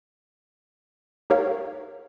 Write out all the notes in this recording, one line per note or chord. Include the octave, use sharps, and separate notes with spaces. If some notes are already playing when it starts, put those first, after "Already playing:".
D#4 G4 A#4 C#5 F5